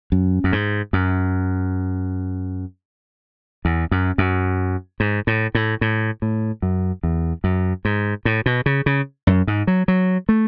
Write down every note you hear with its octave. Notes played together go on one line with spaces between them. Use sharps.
F#2
F#2
G#2
F#2
E2
F#2
F#2
G#2
A2
A2
A2
A2
F#2
E2
F#2
G#2
A2
B2
C#3
C#3
F#2
G#2
F#3
F#3
A3